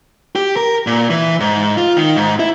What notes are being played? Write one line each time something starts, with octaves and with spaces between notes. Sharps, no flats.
G4
A#4
A#2
E3
G#2
F4
D#3
G#2
E4